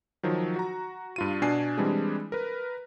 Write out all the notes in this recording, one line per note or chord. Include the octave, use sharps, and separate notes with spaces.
D#3 F3 F#3
F#4 A#5
G2 F4 D#7
B2 D4 G#5 C7
E3 G3 G#3 C4 D4 G#4
A#4 B4